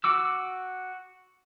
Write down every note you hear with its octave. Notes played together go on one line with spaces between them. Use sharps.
F#4 D6 E6